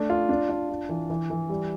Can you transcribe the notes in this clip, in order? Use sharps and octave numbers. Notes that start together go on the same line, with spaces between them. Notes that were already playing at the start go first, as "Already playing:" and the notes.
Already playing: A3 D4
F4
D4
D4
F4
E3
E3
E3
G3